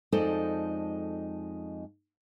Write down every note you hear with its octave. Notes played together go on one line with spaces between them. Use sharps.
F2 G#3 D#4 A4 C5 D5